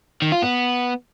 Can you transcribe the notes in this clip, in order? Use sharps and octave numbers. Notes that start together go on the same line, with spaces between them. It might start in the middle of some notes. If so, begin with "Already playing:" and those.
D#3
F4
B3